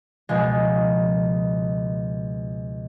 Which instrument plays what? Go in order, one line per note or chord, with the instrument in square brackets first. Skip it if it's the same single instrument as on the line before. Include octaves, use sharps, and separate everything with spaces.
[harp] C#2 B2 F3 G#3